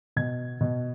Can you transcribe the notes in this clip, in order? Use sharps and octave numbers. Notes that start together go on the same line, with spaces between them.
B2 G#6
B2